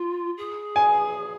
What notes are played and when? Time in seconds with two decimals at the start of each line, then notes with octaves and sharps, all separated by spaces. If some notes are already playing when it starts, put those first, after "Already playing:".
Already playing: F4
0.37 G#4
0.76 G#5